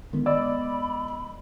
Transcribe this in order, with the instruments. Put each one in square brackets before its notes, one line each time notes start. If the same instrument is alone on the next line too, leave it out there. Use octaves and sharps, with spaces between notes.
[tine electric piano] D3 D#3 [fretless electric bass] G#3 B3
[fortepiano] D5 [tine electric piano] D#5 E6 [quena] B5